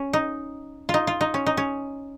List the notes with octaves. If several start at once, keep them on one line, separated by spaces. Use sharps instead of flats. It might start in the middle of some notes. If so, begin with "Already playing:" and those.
Already playing: C#4
D#4
F4
D#4
F4
D#4
C#4
D#4
C#4